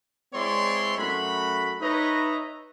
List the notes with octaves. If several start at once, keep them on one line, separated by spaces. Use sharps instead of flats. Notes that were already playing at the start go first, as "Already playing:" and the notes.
G#3 C4 E4 C#5 D5 C6
F#2 A3 F#4 B5
D#4 B4 C#5 D#5 E5 A#5